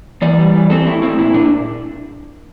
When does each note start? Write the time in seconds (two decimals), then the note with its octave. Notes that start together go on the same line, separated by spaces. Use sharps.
0.22 E3 D5
0.38 G3
0.55 E3
0.70 C4 A4
0.87 A3 E4
1.02 C4 E4
1.18 A#2 E4
1.34 A#2 D4